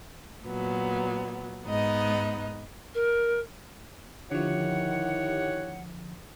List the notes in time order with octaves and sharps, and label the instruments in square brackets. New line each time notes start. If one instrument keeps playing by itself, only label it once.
[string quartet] A#2 F#3 B3
G#2 B3 D#4 D#5
[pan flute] A#4
[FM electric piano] D3 F3 [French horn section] D#3 E4 [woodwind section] G4 C#5 F#5